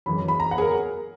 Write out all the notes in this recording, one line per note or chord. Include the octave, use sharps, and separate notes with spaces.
F#2 E3 G#3 B5
B5
A#5
F#5
G#4
A#4